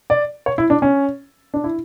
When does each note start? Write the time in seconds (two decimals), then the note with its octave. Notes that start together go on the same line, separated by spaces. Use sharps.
0.10 D5
0.46 C#5
0.58 E4
0.70 D4
0.82 C#4
1.54 D4
1.64 E4